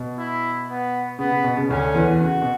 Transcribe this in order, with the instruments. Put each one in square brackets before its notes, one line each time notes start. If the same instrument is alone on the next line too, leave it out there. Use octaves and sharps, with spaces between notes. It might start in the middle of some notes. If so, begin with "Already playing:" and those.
Already playing: [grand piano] B2
[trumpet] E4
B3
[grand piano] C#3 [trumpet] B3
[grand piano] C#3
B2
C#3
[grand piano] D2 D3 [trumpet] C#4
[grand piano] E2 E3
[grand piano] C#3 [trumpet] F#4
[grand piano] B2